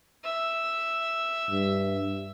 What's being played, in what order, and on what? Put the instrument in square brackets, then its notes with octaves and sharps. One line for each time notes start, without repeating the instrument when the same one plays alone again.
[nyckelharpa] E5
[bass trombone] G2